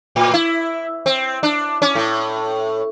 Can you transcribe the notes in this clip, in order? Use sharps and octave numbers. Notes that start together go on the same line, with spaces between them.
A2
E4
C4
D4
C#4
A2